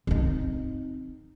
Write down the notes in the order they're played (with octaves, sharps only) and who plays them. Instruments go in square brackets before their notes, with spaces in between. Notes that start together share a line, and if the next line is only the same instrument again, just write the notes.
[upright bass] C4 D#4